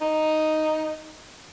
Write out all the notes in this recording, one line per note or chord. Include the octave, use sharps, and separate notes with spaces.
D#4